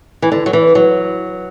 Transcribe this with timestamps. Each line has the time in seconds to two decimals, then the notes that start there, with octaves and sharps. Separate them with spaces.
0.22 E3
0.32 D3
0.46 F#3
0.53 E3
0.75 F#3